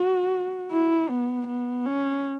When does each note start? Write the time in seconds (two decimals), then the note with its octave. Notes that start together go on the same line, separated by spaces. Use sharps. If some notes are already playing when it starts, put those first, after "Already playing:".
Already playing: F#4
0.71 E4
1.09 B3
1.47 B3
1.85 C#4